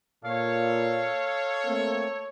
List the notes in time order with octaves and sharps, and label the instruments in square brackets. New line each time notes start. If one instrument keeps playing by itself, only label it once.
[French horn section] A#2 [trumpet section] A4 C#5 [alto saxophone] F5
[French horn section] A3 A#3 C4